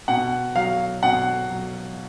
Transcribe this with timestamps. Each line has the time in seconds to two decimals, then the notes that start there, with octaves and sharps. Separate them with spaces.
0.08 B2 F#5
0.55 F#3 F5
1.03 B2 F#5
1.50 F#3